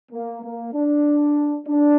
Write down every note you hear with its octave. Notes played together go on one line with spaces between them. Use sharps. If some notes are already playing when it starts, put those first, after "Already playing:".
A#3
A#3
D4
D4